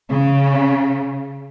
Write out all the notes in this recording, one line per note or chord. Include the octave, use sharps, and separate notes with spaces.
C#3